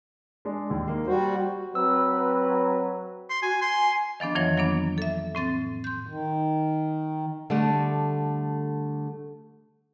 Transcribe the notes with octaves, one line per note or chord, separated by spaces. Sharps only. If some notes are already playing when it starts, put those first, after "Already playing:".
G#3 D4
D#2
A#3
G3 F#4 C5
F#3 C4 B4 E6
C6
F#4 G#5
G#5 C6
D#3 F3 B3 D4
F2 D#3 E3 F#3 C#5
F#3 A#3 B3 D4
A4 E5
A2 C4 A6
C6 G6
D#3
D3 G3 A3